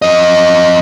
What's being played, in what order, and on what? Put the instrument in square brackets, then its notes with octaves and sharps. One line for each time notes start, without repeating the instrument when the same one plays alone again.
[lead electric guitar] F2 D#5